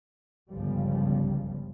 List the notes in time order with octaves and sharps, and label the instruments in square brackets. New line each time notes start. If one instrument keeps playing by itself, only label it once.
[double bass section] G1 C#2 C#3 F3 G3